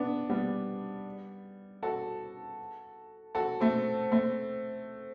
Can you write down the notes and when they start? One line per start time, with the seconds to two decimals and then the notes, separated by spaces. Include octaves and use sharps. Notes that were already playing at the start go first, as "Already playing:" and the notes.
Already playing: B3 D4
0.29 G3 B3
1.83 F#4 A4
3.35 F#4 A4
3.60 A3 C4
4.12 A3 C4